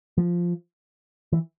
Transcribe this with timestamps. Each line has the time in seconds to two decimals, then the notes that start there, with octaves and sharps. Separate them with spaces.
0.18 F3
1.32 E3